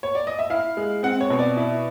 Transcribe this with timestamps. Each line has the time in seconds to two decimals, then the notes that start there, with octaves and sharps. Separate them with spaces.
0.03 C#5
0.15 D5
0.27 D#5
0.39 E5
0.50 E4 F5
0.77 G#3
1.03 C4 F#5
1.21 C#5
1.30 B2
1.39 D5
1.57 E4